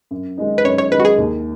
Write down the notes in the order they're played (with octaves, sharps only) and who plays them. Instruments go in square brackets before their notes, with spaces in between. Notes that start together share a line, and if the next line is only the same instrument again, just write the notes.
[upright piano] F#2
D#3 G#3 D#4
[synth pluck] B4
[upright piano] F#2 [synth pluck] C#5
[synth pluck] C#5
[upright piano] D#3 G#3 D#4 [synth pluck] B4
[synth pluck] F#4
G#4
[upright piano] D#2